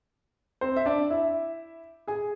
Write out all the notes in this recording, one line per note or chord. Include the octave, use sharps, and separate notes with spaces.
C4 C5
E5
D4 D5
E4 E5
G#4 G#5